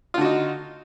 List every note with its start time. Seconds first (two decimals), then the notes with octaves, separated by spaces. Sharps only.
0.14 F4
0.18 D3
0.21 F#4
0.25 D#4